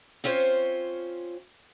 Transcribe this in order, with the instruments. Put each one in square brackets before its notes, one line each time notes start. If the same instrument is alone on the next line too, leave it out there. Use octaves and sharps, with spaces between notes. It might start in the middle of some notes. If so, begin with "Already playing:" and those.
[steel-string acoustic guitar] C4 C#4 F4 C5 C#5